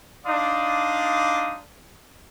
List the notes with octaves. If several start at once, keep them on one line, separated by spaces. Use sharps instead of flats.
D4 D#4 D5 F5 C6 D#6